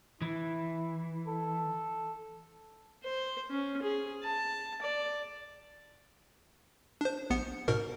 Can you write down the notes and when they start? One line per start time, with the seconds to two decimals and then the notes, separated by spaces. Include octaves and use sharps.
0.22 E3 E4
1.27 A4
3.04 C5
3.50 C#4
3.82 G#4
4.23 A5
4.82 D5
7.01 D4 C5
7.30 A#1 B3 C#7
7.68 G#2 B2 A#4